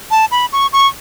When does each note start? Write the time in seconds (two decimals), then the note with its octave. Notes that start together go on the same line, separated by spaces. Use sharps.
0.11 A5
0.31 B5
0.52 C#6
0.73 C#6